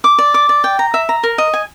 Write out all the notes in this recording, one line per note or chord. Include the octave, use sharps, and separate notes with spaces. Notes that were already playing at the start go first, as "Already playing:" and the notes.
D6
D5
D6
D5
G5
A#5
E5
A#5
A#4
D#5
G#5